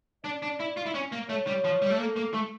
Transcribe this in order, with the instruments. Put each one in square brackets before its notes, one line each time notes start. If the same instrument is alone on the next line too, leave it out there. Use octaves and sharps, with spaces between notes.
[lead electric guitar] D4 [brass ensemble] D5
[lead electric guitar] D4
E4
F4
E4
C#4
A#3
[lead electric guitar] A3 [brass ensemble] C#5
[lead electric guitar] G3
F3
G3
A3
[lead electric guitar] A#3 [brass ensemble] A4
[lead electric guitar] A#3
A3